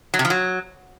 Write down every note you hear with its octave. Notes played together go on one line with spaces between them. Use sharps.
F#3
C3
F3
F#3